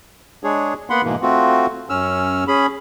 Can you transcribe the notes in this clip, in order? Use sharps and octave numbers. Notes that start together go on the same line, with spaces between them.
G#3 D4 G#4 C#5
A#3 B3 F#5 B5 C6
G#2 B2 E3 A#3
A3 C4 F4 F#4
F#2 C#4 E6 F6
C#4 G#4 B5